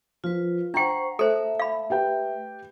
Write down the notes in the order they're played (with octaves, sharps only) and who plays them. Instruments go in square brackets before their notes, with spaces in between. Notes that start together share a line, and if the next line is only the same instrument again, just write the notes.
[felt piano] F3 [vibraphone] F4 B4
[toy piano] D4 G5 [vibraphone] C5 F#5 C#6 [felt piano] A#5
[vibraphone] A3 E5 [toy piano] A4 C5
[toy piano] F5 B5
[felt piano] G4 B4 G5